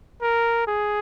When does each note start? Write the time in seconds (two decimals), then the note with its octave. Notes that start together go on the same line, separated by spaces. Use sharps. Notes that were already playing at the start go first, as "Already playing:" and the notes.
0.22 A#4
0.67 G#4